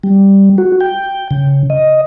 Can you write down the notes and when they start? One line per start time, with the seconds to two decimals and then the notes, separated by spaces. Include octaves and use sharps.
0.04 G3
0.58 F#4
0.81 G5
1.31 C#3
1.70 D#5